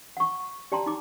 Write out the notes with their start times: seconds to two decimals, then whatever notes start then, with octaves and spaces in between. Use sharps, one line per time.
0.17 F#5 C#6
0.72 G4 D5 G5 A5 A#5 C6
0.86 D#4 D6